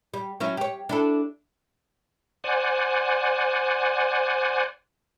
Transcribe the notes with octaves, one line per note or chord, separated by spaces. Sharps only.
G3
F#3 C#4 E4
G4 C#5
D4 E4 A4
C5 D5 F#5 G#5